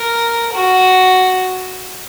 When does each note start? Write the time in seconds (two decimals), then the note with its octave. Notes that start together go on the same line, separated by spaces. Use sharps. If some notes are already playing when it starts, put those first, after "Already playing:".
Already playing: A#4
0.53 F#4